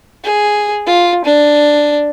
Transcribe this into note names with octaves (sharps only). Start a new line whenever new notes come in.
G#4
F4
D4